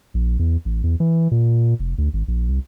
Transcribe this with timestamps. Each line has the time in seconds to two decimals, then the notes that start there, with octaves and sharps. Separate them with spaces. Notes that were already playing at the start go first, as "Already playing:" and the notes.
0.14 A#1
0.39 E2
0.65 A1
0.84 E2
1.00 E3
1.31 A#2
1.79 F1
1.98 D2
2.13 G#1
2.28 A#1
2.48 C2